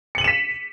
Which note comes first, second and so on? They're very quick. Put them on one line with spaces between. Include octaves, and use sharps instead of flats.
C#7 F#7 D#7 E7 B6